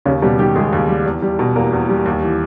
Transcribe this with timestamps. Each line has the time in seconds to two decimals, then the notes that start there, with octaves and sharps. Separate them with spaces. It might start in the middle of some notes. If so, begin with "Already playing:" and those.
0.06 D#2 C#3 C#4
0.22 B2 G3 B3
0.39 D#3 G3 G4
0.55 D#2 G#3 G#4
0.73 D#2
0.89 G3
1.05 E2
1.22 G3
1.39 B2
1.55 E2 A#3 A#4
1.73 E2
1.89 G3
2.06 D#2
2.23 E3